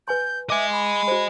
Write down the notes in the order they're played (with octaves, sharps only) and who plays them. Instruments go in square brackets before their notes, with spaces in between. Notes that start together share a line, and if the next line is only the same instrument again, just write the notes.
[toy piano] B4 G#5 C6 [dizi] G6
[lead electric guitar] D#5 G#5 [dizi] E5 [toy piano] D6
[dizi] B5
[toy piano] F#4 C5